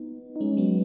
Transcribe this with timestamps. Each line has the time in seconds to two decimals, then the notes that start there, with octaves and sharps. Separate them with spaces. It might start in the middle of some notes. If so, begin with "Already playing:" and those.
Already playing: B3 D#4
0.36 D#4
0.41 G#3 C#4
0.57 F#3 B3